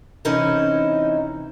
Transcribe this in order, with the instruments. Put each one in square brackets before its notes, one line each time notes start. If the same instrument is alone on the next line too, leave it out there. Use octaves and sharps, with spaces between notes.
[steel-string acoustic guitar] C3 E3 C4 C#4 D#4